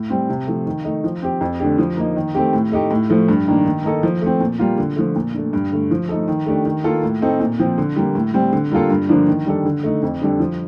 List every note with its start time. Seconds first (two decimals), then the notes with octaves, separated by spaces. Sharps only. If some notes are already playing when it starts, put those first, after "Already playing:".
Already playing: A2
0.10 G3 C4
0.29 C3
0.47 F3 A3
0.66 D#3
0.84 A3 D#4
1.04 F3
1.22 C4 G4
1.41 F2
1.60 D3 A3 D4 G4
1.78 F3
1.97 A#3 D#4
2.16 D#3
2.35 A3 C4 G4
2.53 A2
2.72 A3 D#4 G4
2.91 A2
3.10 F3 A3
3.28 G2
3.47 D#3 A#3 D4
3.66 D#3
3.84 A#3 D#4 A4
4.03 F3
4.22 A3 C4
4.40 A#2
4.59 G3 A#3 F4
4.78 D3
4.96 F3 A3
5.16 A#2
5.34 A3 D4
5.53 G2
5.72 D3 A3
5.91 F3
6.09 A3 D#4 A4
6.28 D#3
6.46 A3 D4 G4
6.65 D#3
6.84 A#3 F4 A4
7.03 A2
7.22 A3 C4 D#4 A4
7.40 A#2
7.59 F3 C4
7.78 D3
7.96 G3 A#3
8.15 A2
8.34 G3 C4
8.52 D3
8.72 G3 A#3 F4 A4
8.90 G2
9.09 D3 F3 A#3 D4
9.28 D#3
9.46 G3 D4 A4
9.65 D3
9.84 A3 D#4
10.02 F2
10.21 D3 G3 D4 A4
10.40 F3